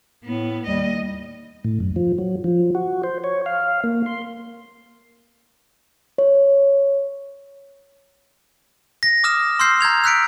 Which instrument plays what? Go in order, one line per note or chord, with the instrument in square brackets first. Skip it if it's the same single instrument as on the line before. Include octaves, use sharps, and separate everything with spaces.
[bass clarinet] A2 [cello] B3
[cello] D#2 D#5 [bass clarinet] G3
[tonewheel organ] A2
F#2
F3
F#3
F3
F#4
C5
C#5
F5
A#3
C6
[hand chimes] C#5
[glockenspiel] A#6
D6 D#6 F6 A#6 E7
C6 E6 F6 G6 C7
A#5 G6 G#6 F7
E6 F#6 B6 C#7 D7